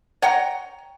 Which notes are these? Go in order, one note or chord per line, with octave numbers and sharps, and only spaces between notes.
C#5 F#5 G5 A#5